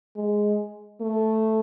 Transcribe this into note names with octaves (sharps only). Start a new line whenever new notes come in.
G#3
A3